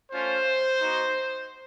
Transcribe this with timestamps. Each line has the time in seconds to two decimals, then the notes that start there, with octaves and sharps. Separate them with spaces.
0.12 A3 C#4 F4 C5
0.80 B3 D#4 F#4